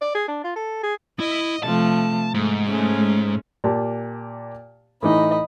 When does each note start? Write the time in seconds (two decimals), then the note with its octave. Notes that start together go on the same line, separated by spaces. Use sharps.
0.02 D5
0.15 G#4
0.28 D4
0.44 F4
0.56 A4
0.83 G#4
1.20 E4 D#5
1.63 C3 F3 A3 A5
2.34 G#2 A3
2.64 G#3 A3 C#4
3.64 A#2 G4 A5
5.03 A2 E3 D#4 D#5 B5